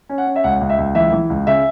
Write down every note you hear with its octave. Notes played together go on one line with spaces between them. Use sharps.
C#4
F#5
C#4
E5
C#2 F#5
C#2
E5
C#2
E3 E5
E3
C#2
C#3 E5